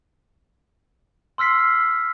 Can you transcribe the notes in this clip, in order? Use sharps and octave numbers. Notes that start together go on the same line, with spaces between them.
C6 E6 F6 B6 C7